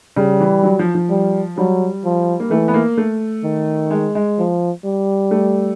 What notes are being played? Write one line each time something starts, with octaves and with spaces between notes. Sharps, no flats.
C#3 G3
E3
F#3
F3
F3
G3
F#3 G3
F3
A#3
E3 A3
B3
A#3
A3
D#3
G#3
G#3
F3
G3
A3